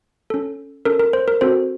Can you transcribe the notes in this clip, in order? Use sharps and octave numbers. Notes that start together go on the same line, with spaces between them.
C#4 A4
C#4 A4 A#4
A#4
C5
A#4
C4 F#4 A4 C5